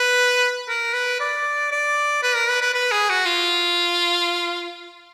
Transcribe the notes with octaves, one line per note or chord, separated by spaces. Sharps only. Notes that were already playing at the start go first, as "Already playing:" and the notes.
Already playing: B4
A#4
B4
D5
D5
B4
A#4
B4
B4
B4
G#4
F#4
F4